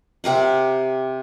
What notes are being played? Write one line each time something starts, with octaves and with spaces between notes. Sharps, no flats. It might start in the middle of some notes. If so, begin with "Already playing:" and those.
C3 G4 A#4 F#5